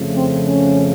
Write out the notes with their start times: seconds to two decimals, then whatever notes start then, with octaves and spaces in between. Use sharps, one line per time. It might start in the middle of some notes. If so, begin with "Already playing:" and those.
Already playing: F2 C#3 F3 A3
0.15 C4
0.45 C#4